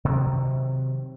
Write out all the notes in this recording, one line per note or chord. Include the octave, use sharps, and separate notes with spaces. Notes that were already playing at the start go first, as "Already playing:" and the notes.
C3 D#3 F#3